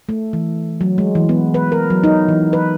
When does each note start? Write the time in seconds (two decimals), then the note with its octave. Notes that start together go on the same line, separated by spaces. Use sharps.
0.09 A3
0.33 E3
0.81 F#3
0.98 G#3
1.15 E3
1.29 B3
1.54 B4
1.72 A#4
1.90 F#3
2.04 D#4
2.29 E3
2.53 B4